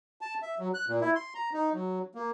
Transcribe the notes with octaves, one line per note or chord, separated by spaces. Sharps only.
A5
E5
F#3
F#6
A#2
E4
C6
A#5
D#4
F#3
A#3